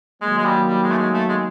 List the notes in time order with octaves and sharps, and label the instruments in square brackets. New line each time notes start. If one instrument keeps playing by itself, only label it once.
[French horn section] D#3 F#3 A#3 [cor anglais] G#3
[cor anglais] G#3
G3
G3
G#3
A3
G#3
A3
G#3